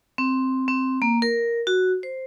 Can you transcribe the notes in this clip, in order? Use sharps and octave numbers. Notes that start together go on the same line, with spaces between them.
C4
C4
A#3
A#4
F#4
C5